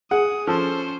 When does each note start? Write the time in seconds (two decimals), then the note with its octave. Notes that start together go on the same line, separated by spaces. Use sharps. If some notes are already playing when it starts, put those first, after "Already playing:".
0.11 G#4 F#5 D#6
0.47 F3 C#4 A4 C5